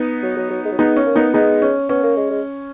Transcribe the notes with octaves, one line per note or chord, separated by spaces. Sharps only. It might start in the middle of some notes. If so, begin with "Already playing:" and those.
Already playing: B3 D#4
F#3
F#3
F#3
G#3
F#3
G#3 B3 D#4
C#4
A#3
B3 D#4
G#3 B3 D#4
C#4
B3 C#4
A#3
G#3
G#3